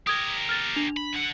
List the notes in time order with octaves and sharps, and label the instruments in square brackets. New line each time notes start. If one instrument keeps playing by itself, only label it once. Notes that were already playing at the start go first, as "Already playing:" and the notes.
[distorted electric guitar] G4 A#4 [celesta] D#6 G#6
[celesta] F6 A6
D4 F7
[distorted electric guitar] B5
D3 F#5